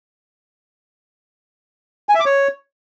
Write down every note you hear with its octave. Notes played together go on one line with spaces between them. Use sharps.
G#5
E5
D6
C#5